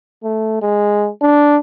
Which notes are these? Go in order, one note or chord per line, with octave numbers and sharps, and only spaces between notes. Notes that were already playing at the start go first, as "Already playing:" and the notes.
A3
G#3
D4